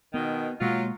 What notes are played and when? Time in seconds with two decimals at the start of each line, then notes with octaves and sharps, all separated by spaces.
0.14 B2 D#3 B3
0.61 B2 F#3 G#3 A#3 F4